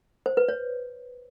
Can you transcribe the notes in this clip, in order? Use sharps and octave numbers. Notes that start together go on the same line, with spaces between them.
C5
B4
C#5